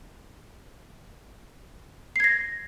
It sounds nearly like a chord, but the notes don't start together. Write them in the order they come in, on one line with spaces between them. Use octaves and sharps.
C7 G#6 A#6